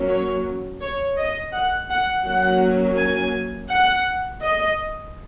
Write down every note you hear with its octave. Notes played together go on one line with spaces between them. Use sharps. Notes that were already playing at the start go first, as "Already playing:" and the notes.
Already playing: F#3 A#3 C#4
C#5
C#5
D#5
F#5
F#5
F#3 A#3 C#4 F#5
G#5
F#5
D#5